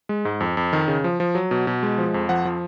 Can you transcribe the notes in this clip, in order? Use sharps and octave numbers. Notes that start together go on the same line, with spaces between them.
G#3
G#2
F2
F2
D#3
C#3
F3
F3
F#3
B2
B2
G#3
F3
F2
F3 F#5
F3